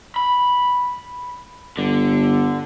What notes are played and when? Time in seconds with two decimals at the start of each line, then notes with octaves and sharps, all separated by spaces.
0.16 B5
1.77 G1 D3